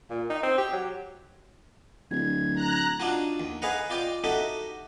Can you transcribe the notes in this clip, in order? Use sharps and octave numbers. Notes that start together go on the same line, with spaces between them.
A#2
D#4
C4
G4
F#3
D1 G#6
A#5 F#6
D4 D#4 F4 F#4
D#2
G#4 B4 D#5 F5 F#5 A#5
F4 D5 D#5 G5
D#4 F#4 G4 A4 D#5 E5